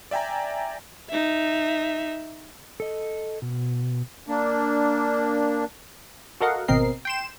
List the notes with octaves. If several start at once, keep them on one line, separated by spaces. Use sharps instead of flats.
D5 E5 G5 G#5 A#5
D#4 E5
A4 D#5
B2
A#3 D4
F#4 A4 A#4 D#5 F5 F#5
G#1 B2 C4 A#4 D#5 C7
G5 C6 E7